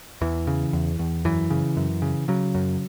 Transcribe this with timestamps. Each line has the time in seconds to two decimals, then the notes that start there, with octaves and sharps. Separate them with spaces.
0.21 E2 E3
0.47 C#3
0.73 E2
0.99 E2
1.25 F#2 E3
1.50 C#3
1.77 F#2
2.02 C#3
2.28 C#3 F#3
2.55 F#2